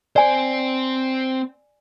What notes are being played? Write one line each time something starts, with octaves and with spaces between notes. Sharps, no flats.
C4 C5 D5 G#5